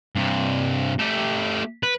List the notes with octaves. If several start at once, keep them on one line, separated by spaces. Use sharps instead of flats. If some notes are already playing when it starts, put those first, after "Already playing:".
G2 C3
A3 G4
B4